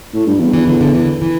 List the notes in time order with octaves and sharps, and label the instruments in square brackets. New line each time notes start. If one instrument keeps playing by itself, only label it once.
[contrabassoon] A2
G2
E2
[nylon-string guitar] E3
D3
D3
E3
E3